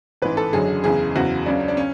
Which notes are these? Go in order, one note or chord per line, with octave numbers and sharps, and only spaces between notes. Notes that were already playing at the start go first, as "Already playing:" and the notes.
A1 G#2 E3 B4
A4
F#1 F#2 D3 F#3 G#4
F#1 E2 C#3 G#4
F#1 E2 C#3 F#4
C#2 C#3 F#3 D4
D4
C#4